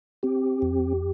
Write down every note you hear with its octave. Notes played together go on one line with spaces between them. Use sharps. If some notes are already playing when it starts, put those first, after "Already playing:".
C4 G4
F2